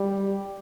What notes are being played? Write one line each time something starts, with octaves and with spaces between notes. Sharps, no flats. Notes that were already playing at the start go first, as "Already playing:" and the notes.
Already playing: G3